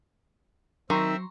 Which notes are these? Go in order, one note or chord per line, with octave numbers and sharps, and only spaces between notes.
D#3 F#3 C4 E5 A#5 C6 C#6